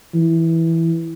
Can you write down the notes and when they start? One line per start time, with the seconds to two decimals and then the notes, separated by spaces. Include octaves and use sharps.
0.15 E3